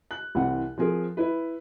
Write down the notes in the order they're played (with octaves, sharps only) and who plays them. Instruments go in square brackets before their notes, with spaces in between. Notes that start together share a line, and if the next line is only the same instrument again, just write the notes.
[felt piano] F#6
C2 E3 C4 F#5
F3 C4 G#4 A#4
E4 B4